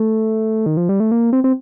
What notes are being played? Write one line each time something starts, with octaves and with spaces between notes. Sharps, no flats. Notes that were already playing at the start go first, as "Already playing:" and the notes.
Already playing: A3
D#3
F3
G3
A3
A#3
C4
C4